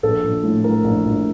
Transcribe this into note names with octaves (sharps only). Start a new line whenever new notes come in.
A#1 A4
A#1
A2
A2 A#4
A#1
A#1